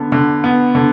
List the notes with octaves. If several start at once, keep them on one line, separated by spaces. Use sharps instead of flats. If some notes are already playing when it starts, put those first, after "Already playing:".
Already playing: D3 B3
D3
B3
D3